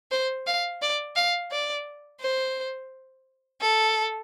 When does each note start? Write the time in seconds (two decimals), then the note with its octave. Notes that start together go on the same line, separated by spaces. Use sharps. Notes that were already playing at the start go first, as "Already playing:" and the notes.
0.11 C5
0.47 F5
0.82 D5
1.16 F5
1.51 D5
2.21 C5
3.61 A4